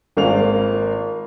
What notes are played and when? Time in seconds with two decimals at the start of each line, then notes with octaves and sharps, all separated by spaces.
0.17 G#1 A#3 C4 F4 F7